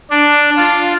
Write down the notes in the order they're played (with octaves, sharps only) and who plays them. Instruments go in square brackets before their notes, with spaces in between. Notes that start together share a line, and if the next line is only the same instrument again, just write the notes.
[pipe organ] D4
F4